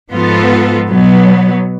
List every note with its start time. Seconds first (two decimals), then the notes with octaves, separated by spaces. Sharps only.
0.12 G#2 F3 B3 F4 A4
0.90 B2 F#3 B3